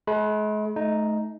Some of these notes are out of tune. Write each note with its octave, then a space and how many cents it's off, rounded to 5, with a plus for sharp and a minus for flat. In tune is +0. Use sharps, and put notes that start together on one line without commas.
G#3 +40 B5 -15
A3 -25 D#4 +0